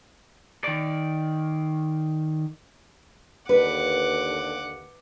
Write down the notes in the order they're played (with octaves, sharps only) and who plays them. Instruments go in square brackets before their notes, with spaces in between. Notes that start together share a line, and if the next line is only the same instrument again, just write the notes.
[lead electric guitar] D#3 D5
[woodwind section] D#2 D3 [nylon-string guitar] B4 [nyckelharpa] F#5 D6